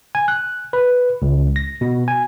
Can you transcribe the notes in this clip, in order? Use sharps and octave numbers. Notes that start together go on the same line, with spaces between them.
G#5
F#6
B4
C#2
A#6
B2
G#5